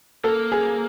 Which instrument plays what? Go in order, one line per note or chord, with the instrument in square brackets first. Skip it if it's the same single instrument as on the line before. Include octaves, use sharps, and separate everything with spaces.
[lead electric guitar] A#3 [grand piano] A4
[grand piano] G#4